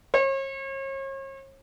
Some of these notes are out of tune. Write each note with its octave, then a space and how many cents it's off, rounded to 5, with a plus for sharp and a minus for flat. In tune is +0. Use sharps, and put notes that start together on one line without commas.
C#5 -40